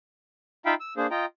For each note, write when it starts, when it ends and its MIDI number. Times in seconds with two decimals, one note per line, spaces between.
0.66 0.74 63
0.66 0.74 65
0.66 0.74 76
0.66 0.74 77
0.66 0.74 79
0.66 0.74 83
0.80 0.94 88
0.97 1.07 58
0.97 1.07 62
0.97 1.07 68
0.97 1.07 72
1.11 1.25 65
1.11 1.25 75
1.11 1.25 79
1.11 1.25 82